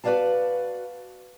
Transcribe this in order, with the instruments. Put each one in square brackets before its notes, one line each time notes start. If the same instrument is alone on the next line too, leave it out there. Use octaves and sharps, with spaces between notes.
[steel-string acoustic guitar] F#4 B4 C#5 D5 F5 A5